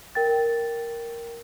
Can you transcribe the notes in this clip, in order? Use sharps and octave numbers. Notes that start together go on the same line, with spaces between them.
A#4 G5 A6